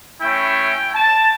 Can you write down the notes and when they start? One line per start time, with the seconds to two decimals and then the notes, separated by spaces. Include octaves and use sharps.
0.21 A3 C#4 E4 G5
0.94 A5